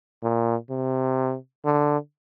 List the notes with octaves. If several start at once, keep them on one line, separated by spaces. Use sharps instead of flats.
A#2
C3
D3